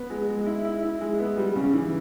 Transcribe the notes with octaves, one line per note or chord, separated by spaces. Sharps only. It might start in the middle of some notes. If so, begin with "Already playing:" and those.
Already playing: B3
G#3
G#3
E4
E4
E4
G#3
B3
G3
C#3
E3